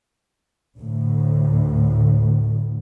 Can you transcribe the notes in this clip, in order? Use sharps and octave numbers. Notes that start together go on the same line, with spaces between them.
D2 A2